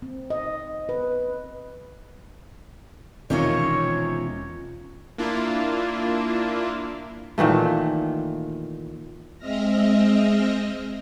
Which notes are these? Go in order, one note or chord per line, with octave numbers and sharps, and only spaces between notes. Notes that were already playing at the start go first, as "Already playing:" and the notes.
C4
D#5
B4
E1 E2 C3 D#3 C#4 F4 C#5 D#5
A#3 D4 E4 F4
A#2 D#3 E3 A3
G#3 C4 D#5 E5 F6 A#6